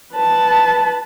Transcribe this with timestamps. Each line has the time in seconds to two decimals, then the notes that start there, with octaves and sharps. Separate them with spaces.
0.14 B4 A5